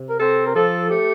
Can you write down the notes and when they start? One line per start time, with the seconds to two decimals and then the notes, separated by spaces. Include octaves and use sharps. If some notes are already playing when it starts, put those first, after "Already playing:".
Already playing: C3
0.10 A#4
0.20 C4 A4
0.47 A#4
0.55 F3 A4
0.90 A3 G4